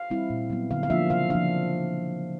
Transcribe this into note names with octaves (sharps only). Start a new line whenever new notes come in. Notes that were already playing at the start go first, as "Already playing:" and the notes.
Already playing: F5
G3 C4 E4
A#2
F#3 B3
D3 F5
F5
F3 A#3 D4 F4 E5
C#3 F5
F3 A#3 D4 F5